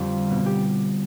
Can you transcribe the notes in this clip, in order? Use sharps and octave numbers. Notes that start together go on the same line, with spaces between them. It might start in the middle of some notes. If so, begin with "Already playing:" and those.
Already playing: F2 D3 G3 C4 G4
B2 B3
G4